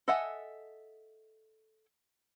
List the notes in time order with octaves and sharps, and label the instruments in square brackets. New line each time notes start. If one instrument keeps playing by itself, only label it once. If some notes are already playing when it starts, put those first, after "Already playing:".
[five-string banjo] A4 D#5 E5 F#5 G#5